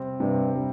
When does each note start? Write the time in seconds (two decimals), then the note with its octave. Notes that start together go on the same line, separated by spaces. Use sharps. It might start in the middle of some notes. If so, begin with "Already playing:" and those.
Already playing: C3 G3 C4 G4
0.20 G2 C3
0.55 G3